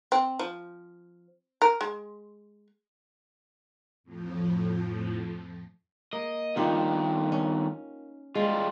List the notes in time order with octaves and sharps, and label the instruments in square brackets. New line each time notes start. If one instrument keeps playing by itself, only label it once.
[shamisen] C4
F3
A#4
G#3
[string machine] F2 A2 F3
[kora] A#3 [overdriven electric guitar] D#5
[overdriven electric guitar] G2 D#3 [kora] D#4 F4 G4
[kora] C#4
[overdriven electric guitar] G3 F4 [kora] G#3